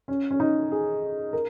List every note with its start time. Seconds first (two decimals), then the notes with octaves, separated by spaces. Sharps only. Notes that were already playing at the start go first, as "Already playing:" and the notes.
0.08 C#4
0.31 C#4
0.40 D#4
0.71 G#4
1.33 A#4